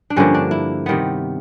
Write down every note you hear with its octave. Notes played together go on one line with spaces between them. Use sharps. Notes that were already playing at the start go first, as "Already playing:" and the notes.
D4
G2 D3 F3 A#3 C#4
D4
E4
C3 D#3 G3 B3